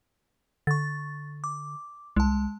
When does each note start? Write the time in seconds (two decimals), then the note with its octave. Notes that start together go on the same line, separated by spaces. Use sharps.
0.67 D3 C#6 A6
1.44 D6
2.16 C2 G#3 A5